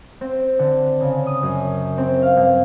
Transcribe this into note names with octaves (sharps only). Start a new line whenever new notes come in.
C4
D3
C#3
D#6
F#2
C4
F5
G2